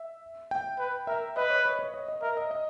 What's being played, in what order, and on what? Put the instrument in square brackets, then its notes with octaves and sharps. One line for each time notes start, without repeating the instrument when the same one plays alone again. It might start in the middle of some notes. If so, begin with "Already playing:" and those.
Already playing: [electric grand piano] E5
G5
[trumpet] B4
[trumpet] A#4 [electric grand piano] E5
[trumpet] B4 [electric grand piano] D#5
[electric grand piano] C#5
B4
C#5
D#5
D#5
[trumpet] A#4 [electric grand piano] E5
[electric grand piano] D#5
D#5